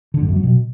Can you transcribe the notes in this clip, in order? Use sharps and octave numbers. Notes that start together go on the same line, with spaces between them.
D3
G2
F#2
F#3
B2